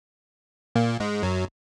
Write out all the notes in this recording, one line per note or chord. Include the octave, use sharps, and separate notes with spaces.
A#2 A#3
G#2 G#3
F#2 F#3